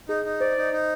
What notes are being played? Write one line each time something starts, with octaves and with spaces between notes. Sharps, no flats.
D#4 G#4
D#4
C5 D5
D#4
D#4